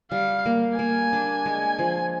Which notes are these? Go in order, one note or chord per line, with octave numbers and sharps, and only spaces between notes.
G3 F5
A#3
A#3 G#5
D4
G#3
F3